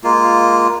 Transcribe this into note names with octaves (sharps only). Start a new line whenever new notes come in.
G#3 A#3 F4